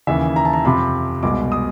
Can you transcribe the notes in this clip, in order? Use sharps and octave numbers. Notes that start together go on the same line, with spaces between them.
D#2 C#3 E3 E5
A#5
A5
A#5
F2 C3 F3 B5
C2 B2 G#3 D6
D#6